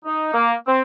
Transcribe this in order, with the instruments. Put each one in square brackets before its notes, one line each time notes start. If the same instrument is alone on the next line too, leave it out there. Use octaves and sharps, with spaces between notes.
[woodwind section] D#4
A#3
C4